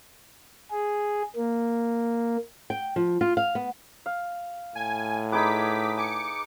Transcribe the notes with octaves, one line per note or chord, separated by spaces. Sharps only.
G#4
A#3
G5
F3
F4
F5
B3
F5
A2 G#5
D#4 G#4 B4 D6 B6
G#5 D6 C#7